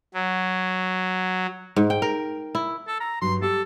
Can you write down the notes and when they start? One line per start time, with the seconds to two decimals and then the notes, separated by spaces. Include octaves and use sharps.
0.14 F#3
1.76 G#2
1.90 G5
2.02 A#4
2.55 E4
2.88 A4
3.00 A#5
3.22 G2 F#3 C6
3.42 G4 A4